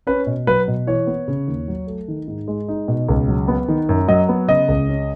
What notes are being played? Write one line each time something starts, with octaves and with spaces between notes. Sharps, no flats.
C#4 B4
B2
F#3 B4
B2
E3 C#5
B3
C#3
D#2
F#3
A3
D#3
G#2
G#3
D#4
B2
C#2
F#3
B3
D#3
F#2
F#3 D#5
B3
C#3 D#5
C#2
C#4